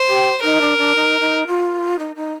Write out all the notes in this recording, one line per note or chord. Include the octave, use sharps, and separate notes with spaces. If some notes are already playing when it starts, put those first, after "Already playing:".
Already playing: C5
G4
D#4 A#4
D4
D4
D#4
D#4
F4
D#4
D#4